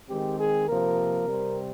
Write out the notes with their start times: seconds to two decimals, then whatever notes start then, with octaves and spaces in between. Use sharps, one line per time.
0.08 D#3 G#3 C4 G4
0.39 G#4
0.67 C3 F3 A#3 A#4
1.25 C3 G3 C4